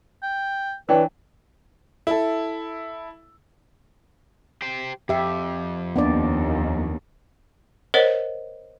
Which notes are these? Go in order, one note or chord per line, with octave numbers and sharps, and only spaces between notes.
G5
E3 D4 B4 C#5 G5 E6
E4 A4
G4 C5
F2 G4 E5
D#2 B3 D4 D5
A#4 C5 C#5 D#5 F#5